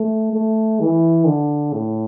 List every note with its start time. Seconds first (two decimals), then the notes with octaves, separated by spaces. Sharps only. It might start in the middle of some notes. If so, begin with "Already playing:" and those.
Already playing: A3
0.33 A3
0.80 E3
1.26 D3
1.73 A2